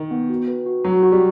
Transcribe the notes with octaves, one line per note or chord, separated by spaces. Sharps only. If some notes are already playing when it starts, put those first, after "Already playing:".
Already playing: D#3
B3
F#4
B4
F#4
F#3 F#4
F#4
G3